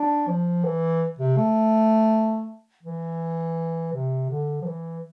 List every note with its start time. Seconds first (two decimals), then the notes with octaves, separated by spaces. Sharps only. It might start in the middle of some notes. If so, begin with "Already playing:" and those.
Already playing: D4
0.27 F3
0.65 E3
1.19 C3
1.37 A3
2.83 E3
3.93 C3
4.30 D3
4.62 F3
4.66 E3